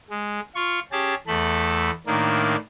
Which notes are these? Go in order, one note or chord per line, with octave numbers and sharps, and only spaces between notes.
G#3
F4 C#6
C#4 G4 G#4 A5
E2 A3 A4 B5
A2 D#3 A#3 D4